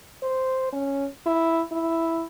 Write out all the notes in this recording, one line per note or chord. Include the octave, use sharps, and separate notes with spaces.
C5
C#4
E4
E4